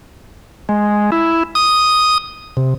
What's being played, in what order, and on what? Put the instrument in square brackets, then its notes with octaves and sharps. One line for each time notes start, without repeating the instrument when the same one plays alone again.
[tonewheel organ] G#3
E4
D#6
C3